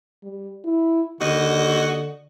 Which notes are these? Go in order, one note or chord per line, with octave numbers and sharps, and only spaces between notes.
G3
E4
D#2 D3 F#4 D#5